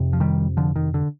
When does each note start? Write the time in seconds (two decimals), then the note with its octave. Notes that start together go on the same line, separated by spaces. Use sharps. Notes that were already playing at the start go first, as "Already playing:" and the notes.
Already playing: F2 C3
0.13 F3
0.20 D#3 G3
0.57 D3 F3
0.76 D#3
0.94 D3